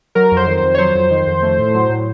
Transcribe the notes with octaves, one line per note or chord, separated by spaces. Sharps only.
F#3 A#4
F2
C5
D#3
C5
F2
C#5
F#3 C5
F2
D#3
F2
A3
A2
F#3
A2